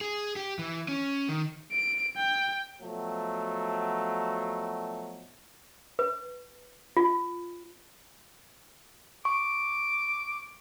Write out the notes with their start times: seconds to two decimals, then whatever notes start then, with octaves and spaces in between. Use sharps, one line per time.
0.01 G#4
0.36 G4
0.59 E3
0.88 C#4
1.29 D#3
1.72 D7
2.17 G5
2.82 B2 F3 F#3 A3
5.99 B4
6.97 F4
9.25 C#6 D6